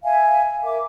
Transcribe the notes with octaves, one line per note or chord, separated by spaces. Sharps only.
E5 F5 G#5
A#4 E5 D6